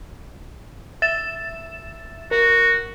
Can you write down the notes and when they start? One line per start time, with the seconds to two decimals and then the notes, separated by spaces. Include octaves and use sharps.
1.02 E5 A6 E7
2.31 F#4 A#4